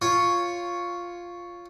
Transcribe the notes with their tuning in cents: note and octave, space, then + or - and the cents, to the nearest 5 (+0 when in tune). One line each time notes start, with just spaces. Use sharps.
F4 +0 C#5 +0